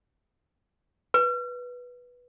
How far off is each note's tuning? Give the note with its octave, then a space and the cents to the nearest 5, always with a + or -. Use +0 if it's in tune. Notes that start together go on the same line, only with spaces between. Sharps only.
B4 -10